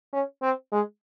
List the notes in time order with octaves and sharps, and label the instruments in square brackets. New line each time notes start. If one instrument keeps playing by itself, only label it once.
[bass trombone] C#4
C4
G#3